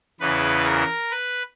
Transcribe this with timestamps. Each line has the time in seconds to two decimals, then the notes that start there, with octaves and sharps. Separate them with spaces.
0.20 E2 C#3 E3 B4
0.65 A#4
1.11 B4